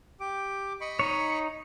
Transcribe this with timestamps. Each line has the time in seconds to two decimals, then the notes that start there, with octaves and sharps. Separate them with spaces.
0.20 G4 D6
0.81 D#5 B5 C#6
0.99 D#4 C#5